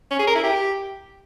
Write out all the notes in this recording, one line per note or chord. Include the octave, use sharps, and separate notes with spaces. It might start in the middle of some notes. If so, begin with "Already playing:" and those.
C#4
G#4
A#4
E4
G4